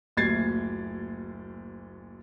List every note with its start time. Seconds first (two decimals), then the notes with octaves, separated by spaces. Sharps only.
0.17 F#1 D2 A#2 G#6 A6 C7